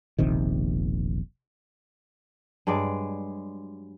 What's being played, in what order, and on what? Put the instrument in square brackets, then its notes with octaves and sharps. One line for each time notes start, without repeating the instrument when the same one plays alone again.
[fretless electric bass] E1 A#1 C3 D#3
[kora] G2 F#3 G#3 D5